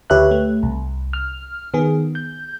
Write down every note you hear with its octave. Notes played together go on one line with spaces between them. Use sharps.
D2 G4 B4 C#5 E5 F#6
A3
C2
F6
D#3 B3 G#4
G6